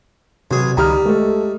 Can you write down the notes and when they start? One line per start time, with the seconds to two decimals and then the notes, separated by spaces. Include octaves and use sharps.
0.51 B1 C3 G#4
0.77 C#2 D#3 G3 A#5 D#6 F6
1.05 G#3 A3 A4